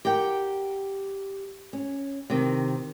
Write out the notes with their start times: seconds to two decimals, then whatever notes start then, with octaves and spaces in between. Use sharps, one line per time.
0.05 G4 A#4 F#5 G5
1.73 C#4
2.30 C3 D#3